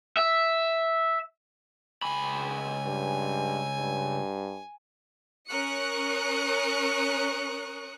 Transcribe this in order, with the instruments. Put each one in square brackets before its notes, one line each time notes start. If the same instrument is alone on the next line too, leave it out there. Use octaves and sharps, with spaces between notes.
[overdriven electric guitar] E5
[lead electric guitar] C#2 B5 [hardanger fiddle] G#5
[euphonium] G2
G2
[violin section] C#4 A#4 C#6 D#6 F#6 C#7